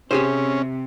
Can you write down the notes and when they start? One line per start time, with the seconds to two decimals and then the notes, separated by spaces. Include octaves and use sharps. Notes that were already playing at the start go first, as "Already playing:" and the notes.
0.11 C3 C#4 G4 G#4 C5